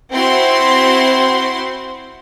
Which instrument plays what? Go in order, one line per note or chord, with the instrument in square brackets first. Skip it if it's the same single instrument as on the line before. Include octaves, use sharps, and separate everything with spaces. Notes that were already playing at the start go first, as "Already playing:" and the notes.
[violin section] C4 E4 F#4 C5 C6